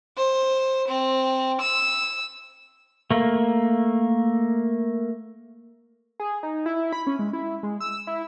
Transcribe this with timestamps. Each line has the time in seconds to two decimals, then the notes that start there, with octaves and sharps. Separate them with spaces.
0.17 C5
0.88 C4
1.61 E6
3.11 A3 A#3
6.20 G#4
6.43 D#4
6.66 E4
6.93 B5
7.07 C#4
7.19 G#3
7.33 E4
7.63 G#3
7.80 E6
8.07 E4